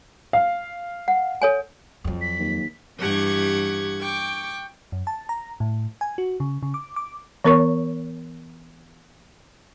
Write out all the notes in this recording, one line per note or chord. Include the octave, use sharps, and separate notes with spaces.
F5
F#5
A4 C#5 G#5
F2 F#3
B6
D#2
G2 E3 G4 F#5 C#6 G#6
G5 C#6 D6
F#2
A5
A#5
A2
G#5
F#4
C#3
C#3
D6
D6
E3 B3 A#4 C#5 C#6